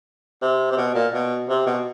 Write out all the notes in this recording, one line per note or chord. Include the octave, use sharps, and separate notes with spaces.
C3
C3
B2
A#2
B2
C3
B2